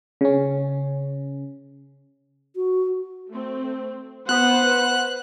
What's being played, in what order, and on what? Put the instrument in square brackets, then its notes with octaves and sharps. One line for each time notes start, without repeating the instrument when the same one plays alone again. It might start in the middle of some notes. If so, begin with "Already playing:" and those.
[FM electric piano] C#3 C#4
[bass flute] F#4
[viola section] A3 C4
[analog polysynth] B3 [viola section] B4 C5 [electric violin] F#5 [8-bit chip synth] F#6